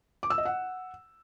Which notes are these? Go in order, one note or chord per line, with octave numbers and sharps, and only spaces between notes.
D6
E6
D#5
F#5